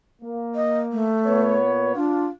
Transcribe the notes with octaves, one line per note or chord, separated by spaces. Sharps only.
A#3
D#5
A3
A#2 B3 C#5
D4 F4